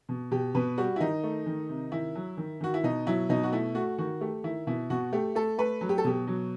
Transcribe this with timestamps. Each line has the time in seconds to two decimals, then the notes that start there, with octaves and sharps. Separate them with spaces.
0.09 B2
0.31 B2 G4
0.55 B2 B4
0.78 G3 F#4
0.96 E4
1.00 D#3 D#4
1.23 A3
1.46 D#3
1.69 C3
1.92 D#3 E4
2.15 F#3
2.37 D#3
2.61 D#3 F#4
2.74 E4
2.83 B2 D#4
3.07 F#3 E4
3.29 B2 D#4
3.43 F#4
3.52 A3 E4
3.75 A3 F#4
3.98 D#3 F#4
4.21 A3 G4
4.44 D#3 E4
4.67 B2 E4
4.90 B2 F#4
5.13 A3 G4
5.35 A3 A4
5.58 A3 B4
5.81 F#3
5.89 G4
5.98 A4
6.04 B2 G4
6.27 F#3